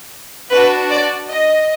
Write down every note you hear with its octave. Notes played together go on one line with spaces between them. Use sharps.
D4 F#4 B4
D5
D#5